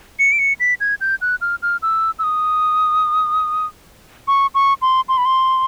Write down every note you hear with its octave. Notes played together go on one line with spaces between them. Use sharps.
C#7
D7
C#7
B6
G#6
G6
F#6
F6
F6
E6
E6
D#6
C#6
C#6
C6
C6
B5
C6